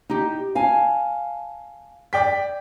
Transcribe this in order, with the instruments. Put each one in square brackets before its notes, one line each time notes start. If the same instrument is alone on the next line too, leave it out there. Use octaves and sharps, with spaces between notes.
[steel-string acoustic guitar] D#4 G4
F5 G#5 A5
[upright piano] D5 G5 B6